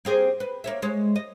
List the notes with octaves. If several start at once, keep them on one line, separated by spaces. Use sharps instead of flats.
A#3 C4 G#4
B4
A#3 C#5 E5
G#3 C#5
D#5